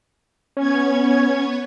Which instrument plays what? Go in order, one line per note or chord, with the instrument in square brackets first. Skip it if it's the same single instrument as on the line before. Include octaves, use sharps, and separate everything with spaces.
[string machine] B3 C#5 G#6 [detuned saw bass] C#4